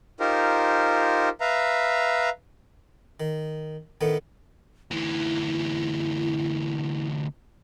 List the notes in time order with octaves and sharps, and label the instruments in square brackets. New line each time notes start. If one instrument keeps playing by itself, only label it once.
[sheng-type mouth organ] D#4 F4 G4 A#4 C5
B4 E5 F5 A#5
[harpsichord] D#3
A2 D#3 A3 B3
[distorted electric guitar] D2 E3 [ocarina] E4